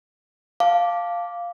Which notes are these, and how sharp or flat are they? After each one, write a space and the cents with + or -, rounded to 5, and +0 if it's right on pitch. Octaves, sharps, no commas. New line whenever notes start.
F5 +0 A5 +0 D6 -5